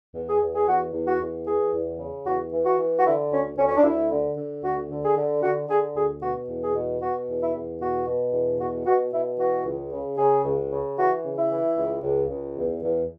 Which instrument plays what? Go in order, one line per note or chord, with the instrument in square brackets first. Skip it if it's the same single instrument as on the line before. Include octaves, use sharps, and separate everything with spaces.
[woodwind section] E2
G#4
E2
G#4
E2 F#4
E2
F#4
E2
E3 G#4
E2
C#3
E2 F#4
E3
F#4
E3
F#4
D3 E4
D2 C#4
D2 C#4
C#4
D4
D2 E4
D3
D3
D2 F#4
D3
G#4
D3
D3 F#4
D3 G#4
D2 G#4
B2 F#4
E2
G#4
B2
B2 F#4
E2
E4
E2
B2 F#4
B2
E2
B2 F#4
B2 F#4
B2 E4
E3 F#4
C#2
C#3
C#3 G#4
C#2
C#3
E3 F#4
C#3
E4
E3
C#2
C#2
C#2
E2
E2